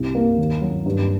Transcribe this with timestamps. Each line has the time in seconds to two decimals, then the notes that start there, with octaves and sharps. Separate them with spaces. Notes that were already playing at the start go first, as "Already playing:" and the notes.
Already playing: C2
0.15 A#3
0.38 D#2
0.62 F#3
0.86 G2